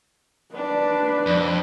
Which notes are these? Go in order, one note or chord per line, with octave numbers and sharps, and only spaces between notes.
D4 B4 D5
F2